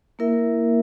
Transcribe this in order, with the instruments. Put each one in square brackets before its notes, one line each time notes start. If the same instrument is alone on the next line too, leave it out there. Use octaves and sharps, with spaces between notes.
[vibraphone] A#3 E4 A#4 E5